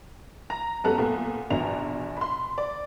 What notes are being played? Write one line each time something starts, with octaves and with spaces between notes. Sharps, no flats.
A#5 A#6
F#2 B3 G4 A4 A#5 F#6
A#2 A3 B3
A#1 B2 E3 D4 A#5 F7
B5 C6
D5